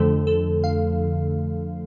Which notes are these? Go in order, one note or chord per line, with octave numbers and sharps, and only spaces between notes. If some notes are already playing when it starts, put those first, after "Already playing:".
Already playing: F2 D3 F3 A3 A4
A4
F5